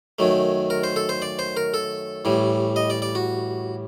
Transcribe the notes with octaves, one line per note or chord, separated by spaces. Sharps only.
F#2 D#3 F#3 A3
A#4
C5
A4
C5
D5
C5
A#4
A4
A1 A2 G3
D#5
D5
D5
F#4